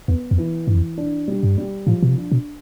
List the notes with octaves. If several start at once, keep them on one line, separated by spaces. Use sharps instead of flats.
E2 B3
F2
E3
G2 E3
F2
D4
G3
G2
G3
A2 F3
B2
C3
D4
B2